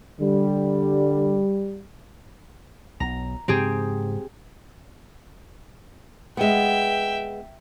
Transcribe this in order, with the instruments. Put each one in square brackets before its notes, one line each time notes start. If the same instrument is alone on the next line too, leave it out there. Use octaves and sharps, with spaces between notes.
[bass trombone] D3 [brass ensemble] G3
[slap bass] B1 [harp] A#5
[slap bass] G#2 C#3 F3 [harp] C4 G4 G#4
[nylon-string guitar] G#3 B3 [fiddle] E5 G5